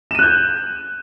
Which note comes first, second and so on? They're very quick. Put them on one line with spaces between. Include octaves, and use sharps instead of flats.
E7 D#7 F#6 G6